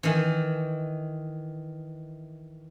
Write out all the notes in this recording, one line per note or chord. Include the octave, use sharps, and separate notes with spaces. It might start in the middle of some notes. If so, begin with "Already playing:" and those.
D#3 E3